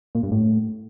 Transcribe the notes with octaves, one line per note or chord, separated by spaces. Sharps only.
A#2
G2
A2